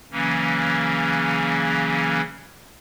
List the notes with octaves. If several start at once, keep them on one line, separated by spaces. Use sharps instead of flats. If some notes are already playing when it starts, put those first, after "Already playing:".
C#3 E3 F#3 A#3 C#4